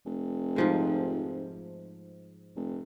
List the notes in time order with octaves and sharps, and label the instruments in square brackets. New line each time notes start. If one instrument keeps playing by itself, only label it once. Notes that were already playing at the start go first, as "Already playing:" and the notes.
[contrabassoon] F1
[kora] G#2 F3 G#3
[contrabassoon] F1